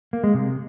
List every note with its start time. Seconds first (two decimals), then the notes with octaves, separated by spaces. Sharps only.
0.13 A#3
0.24 G#3
0.34 C3